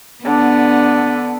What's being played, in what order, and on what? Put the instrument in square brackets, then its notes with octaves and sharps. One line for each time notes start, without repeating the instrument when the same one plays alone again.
[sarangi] D3 [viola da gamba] B3 [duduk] D4